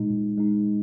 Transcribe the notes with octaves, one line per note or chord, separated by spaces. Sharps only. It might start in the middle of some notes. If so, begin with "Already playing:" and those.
Already playing: A#2 G#3 D#4
A#2
G#3 D#4